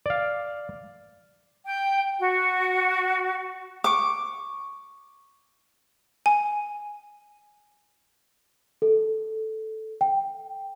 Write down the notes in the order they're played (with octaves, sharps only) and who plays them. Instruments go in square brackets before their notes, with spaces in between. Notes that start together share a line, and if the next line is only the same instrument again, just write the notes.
[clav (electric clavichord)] D5 F5
[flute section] G5
F#4
[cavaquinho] C#6 D6
[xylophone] G#5
[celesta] A4
G5